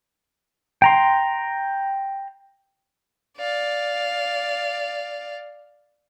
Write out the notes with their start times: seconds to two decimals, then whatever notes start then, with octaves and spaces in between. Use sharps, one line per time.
0.82 G5 A#5 C6
3.37 D5 F5